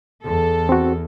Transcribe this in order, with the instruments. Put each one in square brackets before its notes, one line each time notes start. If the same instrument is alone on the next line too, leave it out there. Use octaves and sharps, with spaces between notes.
[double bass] E2 [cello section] A4
[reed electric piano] C4 F#4